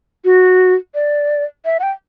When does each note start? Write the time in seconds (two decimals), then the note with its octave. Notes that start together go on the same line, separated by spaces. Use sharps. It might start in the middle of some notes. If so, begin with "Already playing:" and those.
0.25 F#4
0.95 D5
1.65 E5
1.80 F#5
1.83 G5